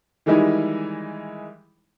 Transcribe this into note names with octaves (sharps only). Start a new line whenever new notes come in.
D#3 E3 G3 G#3 D#4 E4